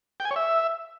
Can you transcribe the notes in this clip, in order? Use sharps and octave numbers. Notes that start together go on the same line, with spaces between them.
G5
G#5
C#5
E5